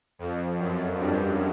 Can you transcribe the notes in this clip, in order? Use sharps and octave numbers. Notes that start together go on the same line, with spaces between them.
F2
F#2
G2